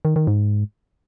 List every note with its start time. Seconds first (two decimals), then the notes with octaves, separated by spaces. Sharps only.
0.05 D#3
0.16 D#3
0.27 G#2